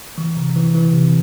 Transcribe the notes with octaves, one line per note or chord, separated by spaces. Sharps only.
E3
C3
E3
E3
C3